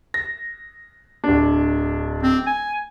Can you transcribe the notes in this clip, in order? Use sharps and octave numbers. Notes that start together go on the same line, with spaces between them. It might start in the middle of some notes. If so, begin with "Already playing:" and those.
A#6
D1 D4
C4
G#5